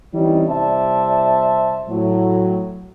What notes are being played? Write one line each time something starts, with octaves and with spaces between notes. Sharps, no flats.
E3 G3 C4 C#4 D#4 E4
C2 C5 D5 E5 A5
A2 F#3